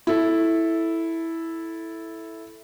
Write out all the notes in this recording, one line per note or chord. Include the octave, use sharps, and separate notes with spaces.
E4 A4